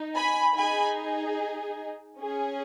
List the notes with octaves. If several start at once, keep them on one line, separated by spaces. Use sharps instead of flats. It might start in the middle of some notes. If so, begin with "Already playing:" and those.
Already playing: D#4
G#5 B5
D#4 G#4 G#5 B5
C#4 G#4